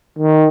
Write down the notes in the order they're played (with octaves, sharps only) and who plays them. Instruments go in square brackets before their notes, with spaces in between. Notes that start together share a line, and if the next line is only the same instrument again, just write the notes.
[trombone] D#3